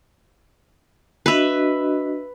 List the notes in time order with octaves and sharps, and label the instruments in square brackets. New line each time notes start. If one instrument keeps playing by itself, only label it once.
[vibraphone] D4 F#4 D#5 [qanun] B4 E5